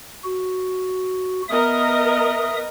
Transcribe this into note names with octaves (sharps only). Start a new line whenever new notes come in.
F#4
B3 A#4 D#5 E5 D#6